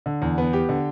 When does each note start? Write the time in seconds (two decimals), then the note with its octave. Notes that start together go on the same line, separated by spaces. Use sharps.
0.06 D3
0.22 E2
0.38 B3
0.53 G4
0.69 D3